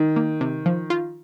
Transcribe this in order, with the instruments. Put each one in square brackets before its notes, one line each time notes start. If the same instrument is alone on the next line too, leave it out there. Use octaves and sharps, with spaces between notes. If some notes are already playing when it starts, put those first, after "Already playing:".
Already playing: [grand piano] D#3
[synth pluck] A#3
C3
F3
F4